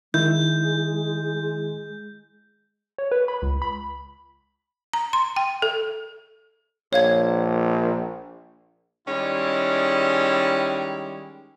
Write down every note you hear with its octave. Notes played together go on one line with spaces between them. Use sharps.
D#3 G#3 E4 G6
C#5
B4
B5
C#2
B5
A#5
C6
G5
A4
A#1 C#5 F5 G#6
D#3 G3 G#3 C#4 E4